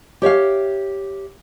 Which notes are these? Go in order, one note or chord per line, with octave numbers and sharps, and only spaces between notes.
G4 C#5 E5 F5